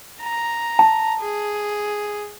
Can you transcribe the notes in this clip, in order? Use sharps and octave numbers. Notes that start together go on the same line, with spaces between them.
A#5
A5
G#4